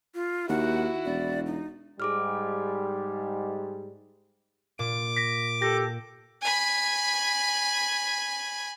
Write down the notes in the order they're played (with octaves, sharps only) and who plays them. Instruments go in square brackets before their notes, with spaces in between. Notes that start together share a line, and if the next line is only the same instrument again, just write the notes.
[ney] F4
[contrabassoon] D#2 [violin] E4 F#4 [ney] F#5
[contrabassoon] E1 [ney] D5
[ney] D#4
[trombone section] G#2 G3 [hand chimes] G#4 D6 F6
[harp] A#2 [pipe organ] D6
[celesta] A#6 B6
[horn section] G4 A4 [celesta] A#6
[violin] G#5 B5